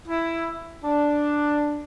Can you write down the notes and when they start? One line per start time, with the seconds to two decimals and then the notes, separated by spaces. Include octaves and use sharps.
0.08 E4
0.84 D4